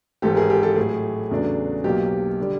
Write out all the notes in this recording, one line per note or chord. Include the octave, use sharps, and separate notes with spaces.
G#1 G#2 E3 G4 A4
G#4 A#4
G4 A4
G4 A4
A2 F#3 A3 G#4
E2 C#3 F#3 A3 D4
B1 B2 F#3 A#3 G4
D3 G3